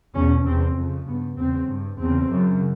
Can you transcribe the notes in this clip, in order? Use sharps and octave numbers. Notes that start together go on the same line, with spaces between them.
E2 B2 C#4
E2 C3 C4
F2 C#3
G2 B3
E2 C#3 C4
G2
E2 C#3 C4
F#2 C#3